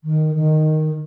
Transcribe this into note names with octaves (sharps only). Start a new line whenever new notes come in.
D#3
D#3